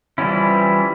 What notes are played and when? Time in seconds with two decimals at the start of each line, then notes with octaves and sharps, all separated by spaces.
0.18 E3 F3 G3 C#4 E4